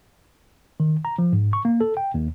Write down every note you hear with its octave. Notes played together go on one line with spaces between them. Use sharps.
D#3
A#5
F3
G#2
C#6
A#3
A4
G5
D#2